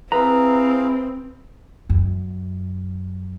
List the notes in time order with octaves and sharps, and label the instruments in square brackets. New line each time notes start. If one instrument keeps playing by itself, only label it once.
[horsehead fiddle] C4 [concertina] E4 G#4 F5 [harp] B4 [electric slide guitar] A#5
[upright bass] F#2